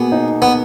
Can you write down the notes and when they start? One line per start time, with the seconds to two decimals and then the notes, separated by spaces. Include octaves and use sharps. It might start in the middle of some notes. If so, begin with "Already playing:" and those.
Already playing: B2 A#3 B3 G#4
0.12 D#4
0.42 B3